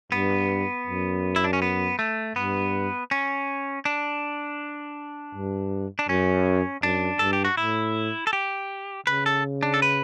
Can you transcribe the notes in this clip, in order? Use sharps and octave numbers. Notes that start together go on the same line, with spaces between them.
G2 B3
F#2
E4
D4
C#4
B3
A3
G2 B3
C#4
D4
G2
D4
F#2 C#4
F#2 D4
G2 A4
G4
F#4
A2 E4
A4
G4
C#3 B4
A4
D4
A4
B4